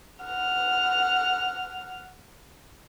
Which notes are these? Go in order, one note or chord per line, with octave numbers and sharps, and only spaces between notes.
F#5 F6